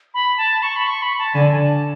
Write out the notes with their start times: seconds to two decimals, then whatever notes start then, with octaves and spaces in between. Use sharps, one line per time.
0.14 B5
0.38 A5
0.63 C#6
0.76 B5
0.87 C#6
1.02 B5
1.18 A5
1.35 D3 G#5
1.52 G#5
1.59 A5